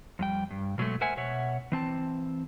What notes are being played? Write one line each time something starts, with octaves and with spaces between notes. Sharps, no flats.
F2 G3 G5
G2
B2 F#3 G#3 A3
A#4 C5 E5 F#5 G#5
B2 C#5 E5 F#5
E3 C4 A5